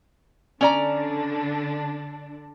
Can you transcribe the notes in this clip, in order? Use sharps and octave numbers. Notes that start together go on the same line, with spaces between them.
D3 C#4 D4 D5 A#5